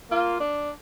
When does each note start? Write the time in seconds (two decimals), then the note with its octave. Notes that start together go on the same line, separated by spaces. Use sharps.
0.11 A#3 F4
0.40 D4